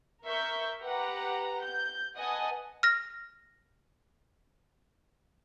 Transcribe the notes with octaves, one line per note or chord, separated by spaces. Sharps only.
A#4 E5 C#6 G6
G4 B4 F#5 A#5
G6
B4 D#5 F#5 G#5 A5 D#6
F6 A#6